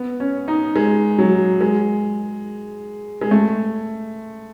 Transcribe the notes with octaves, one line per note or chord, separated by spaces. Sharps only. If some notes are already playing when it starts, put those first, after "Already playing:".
Already playing: B3
C#4
D#4
G#3
F#3
G#3
G#3
A3